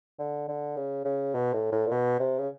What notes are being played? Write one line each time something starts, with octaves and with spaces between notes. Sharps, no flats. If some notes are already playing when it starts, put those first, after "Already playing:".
D3
D3
C#3
C#3
B2
A2
A2
A#2
B2
C3
C#3